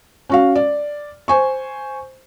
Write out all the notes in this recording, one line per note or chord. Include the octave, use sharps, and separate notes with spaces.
C#4 F#4 F5
D5
C5 G#5 C#6